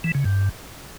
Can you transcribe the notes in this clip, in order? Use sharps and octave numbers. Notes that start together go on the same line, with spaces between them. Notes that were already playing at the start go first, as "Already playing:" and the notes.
E3
C#3
G2